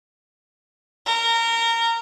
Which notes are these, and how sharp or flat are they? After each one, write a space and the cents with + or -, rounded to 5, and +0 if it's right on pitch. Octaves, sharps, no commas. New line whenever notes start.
A#4 -20